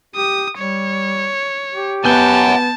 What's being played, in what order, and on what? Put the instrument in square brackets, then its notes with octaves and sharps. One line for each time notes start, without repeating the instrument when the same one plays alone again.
[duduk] G4 [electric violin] D#6
[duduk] G3 [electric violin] C#5
[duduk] G4
[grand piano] B3 G6 G7 [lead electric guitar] F#5 G#5 [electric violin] A5